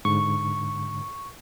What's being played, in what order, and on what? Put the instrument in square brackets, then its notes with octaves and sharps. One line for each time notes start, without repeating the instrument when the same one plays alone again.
[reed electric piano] G#2 D3 [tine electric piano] C#6